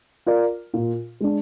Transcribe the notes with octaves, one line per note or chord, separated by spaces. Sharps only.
F4 A#4 D5
A#2
G#3 D4